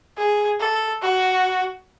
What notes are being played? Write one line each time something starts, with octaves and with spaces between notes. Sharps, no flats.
G#4
A4
F#4